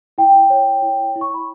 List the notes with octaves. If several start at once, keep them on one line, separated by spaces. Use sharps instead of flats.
E4 G5
C#5
E4
E4
C#6
B5